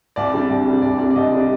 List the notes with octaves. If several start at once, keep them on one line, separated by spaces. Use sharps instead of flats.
C2 D5
C3 G3 D4
C2
C3 G3 D4
C2 D5
C3 G3 D4 D5
D5
C2 D#5
C3 G3 D4